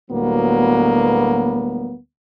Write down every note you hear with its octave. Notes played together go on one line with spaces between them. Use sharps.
D2 A2 F#3 G3 A#3 B3